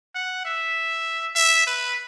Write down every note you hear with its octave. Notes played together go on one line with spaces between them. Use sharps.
F#5
E5
E5
B4